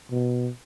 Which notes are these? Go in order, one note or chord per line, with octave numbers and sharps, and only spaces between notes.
B2